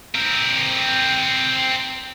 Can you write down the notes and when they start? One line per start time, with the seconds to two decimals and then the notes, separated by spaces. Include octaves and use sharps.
0.15 C4 A#4